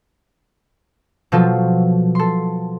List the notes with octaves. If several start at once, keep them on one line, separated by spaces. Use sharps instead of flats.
B2 F3 F#3 F4 A4
A4 C6